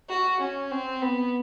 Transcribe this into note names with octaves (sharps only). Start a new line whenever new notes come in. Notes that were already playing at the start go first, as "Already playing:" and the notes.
F#4
C#4
C4
B3